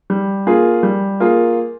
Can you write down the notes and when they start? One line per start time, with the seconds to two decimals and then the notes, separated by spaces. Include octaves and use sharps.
0.10 G3
0.47 A#3 F4 G#4
0.83 G3
1.20 A#3 F4 G#4